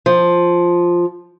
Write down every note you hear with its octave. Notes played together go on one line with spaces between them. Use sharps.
F3